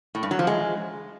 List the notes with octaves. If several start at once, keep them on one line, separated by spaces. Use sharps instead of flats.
A2
G2
F#3
F3
G#3